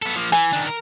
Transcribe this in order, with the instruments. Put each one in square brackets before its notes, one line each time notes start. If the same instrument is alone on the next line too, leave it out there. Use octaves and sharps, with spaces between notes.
[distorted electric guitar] B3 A4
F3 A#3
[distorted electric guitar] E3 [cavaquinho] G#5
[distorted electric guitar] D#3 D4
A#4